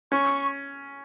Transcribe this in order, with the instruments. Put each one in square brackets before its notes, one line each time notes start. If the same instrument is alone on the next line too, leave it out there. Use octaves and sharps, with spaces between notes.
[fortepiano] C#4 [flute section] C#6